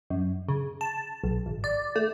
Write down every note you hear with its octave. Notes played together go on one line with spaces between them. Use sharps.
F#2
C#3
A5
B1
G#1
D5
A3